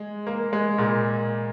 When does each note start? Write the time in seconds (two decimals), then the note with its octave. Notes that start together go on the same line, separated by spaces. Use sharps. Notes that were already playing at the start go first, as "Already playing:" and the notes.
Already playing: G#3
0.27 A#3
0.53 G#3
0.78 A#2